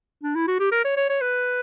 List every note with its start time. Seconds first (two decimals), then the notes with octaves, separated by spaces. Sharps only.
0.23 D4
0.35 E4
0.48 F#4
0.60 G4
0.72 A#4
0.85 C#5
0.97 C#5
1.10 C#5
1.21 B4